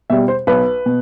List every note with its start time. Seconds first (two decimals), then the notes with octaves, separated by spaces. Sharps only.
0.10 B2 G3 E5
0.28 C5
0.47 B1 B4
0.86 B2